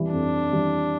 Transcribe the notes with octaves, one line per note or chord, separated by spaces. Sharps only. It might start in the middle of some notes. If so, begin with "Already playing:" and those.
Already playing: F2 E3 G3
F2 D4
E3 G3